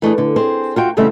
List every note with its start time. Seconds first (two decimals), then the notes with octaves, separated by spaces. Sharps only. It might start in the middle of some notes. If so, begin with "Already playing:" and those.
0.02 E3 A3 D4 G#4
0.18 D3
0.36 C4 G#4 C5
0.76 F4 F#4 G5
0.97 E2 C#3 G3 A3 C4 E5